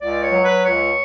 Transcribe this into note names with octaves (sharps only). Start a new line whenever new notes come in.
C#2 D5
C#5
F#3
B4
C#2 C#5